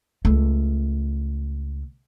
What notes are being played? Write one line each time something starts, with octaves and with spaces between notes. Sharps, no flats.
C#2 A3